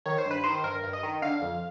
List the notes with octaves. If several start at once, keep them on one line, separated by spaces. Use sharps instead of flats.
D#3 C#5
C5
G2
B4
D#3 C5
G2 A#4
G2
D#5
D#3
D3 F5
F2